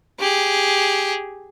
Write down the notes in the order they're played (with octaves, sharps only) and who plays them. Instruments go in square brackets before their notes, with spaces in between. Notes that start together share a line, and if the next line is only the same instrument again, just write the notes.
[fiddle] G4 G#4